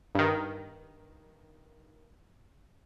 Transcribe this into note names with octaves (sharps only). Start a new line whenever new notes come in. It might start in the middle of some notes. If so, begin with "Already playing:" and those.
G2 D#3